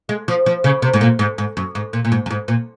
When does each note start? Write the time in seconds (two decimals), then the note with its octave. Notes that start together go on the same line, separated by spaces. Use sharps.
0.09 G#3
0.28 F3
0.46 F3
0.64 C#3
0.82 C3
0.93 G#2
1.01 A#2
1.19 G#2
1.38 G#2
1.57 F#2
1.75 G#2
1.93 A#2
2.05 A#2
2.12 G#2
2.26 F#2
2.31 G#2
2.48 A#2